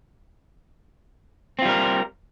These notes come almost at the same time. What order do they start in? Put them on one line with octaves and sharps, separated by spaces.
C4 F4 G3 A#4